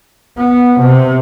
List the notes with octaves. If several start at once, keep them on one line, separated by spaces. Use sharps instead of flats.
B3
C3